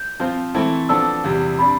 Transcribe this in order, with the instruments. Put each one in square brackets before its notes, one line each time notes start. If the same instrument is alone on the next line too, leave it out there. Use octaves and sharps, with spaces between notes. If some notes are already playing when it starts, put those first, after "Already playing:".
Already playing: [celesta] G6
[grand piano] F3 C4 F4 C5
E3 A3 C4 E4 A4
[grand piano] F3 B3 D4 A4 [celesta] E6
[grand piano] E2 C3 G3
[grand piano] C3 G3 D4 [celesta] B5